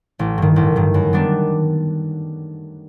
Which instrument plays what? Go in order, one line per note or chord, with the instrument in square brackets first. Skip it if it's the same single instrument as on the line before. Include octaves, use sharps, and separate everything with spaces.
[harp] A1
G2 D#3
A1
G2 D#3
F#2
D#3 G3 B3 D4